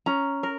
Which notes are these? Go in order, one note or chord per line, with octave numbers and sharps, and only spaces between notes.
C#4 A#5
A#4